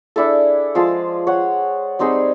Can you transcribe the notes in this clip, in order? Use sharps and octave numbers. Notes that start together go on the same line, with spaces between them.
D4 E4 G#4 A4
F3 G#3 G#4 A5
C#5 F#5
G3 C4 D#4 G#4